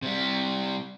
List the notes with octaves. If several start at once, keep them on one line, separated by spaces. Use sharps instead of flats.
C3 G3